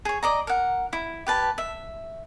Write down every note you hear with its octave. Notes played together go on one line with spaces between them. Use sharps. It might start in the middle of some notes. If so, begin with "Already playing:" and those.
G#4 C#5
D5 D#5 A#5
A#4 F#5
E4
G4 B4 A5
E5